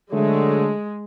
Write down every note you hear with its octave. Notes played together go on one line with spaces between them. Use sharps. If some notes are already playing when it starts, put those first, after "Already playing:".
D3 F#3 G#3 A3